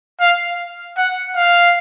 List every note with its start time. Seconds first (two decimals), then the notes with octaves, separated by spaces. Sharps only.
0.20 F5
0.97 F#5
1.36 F5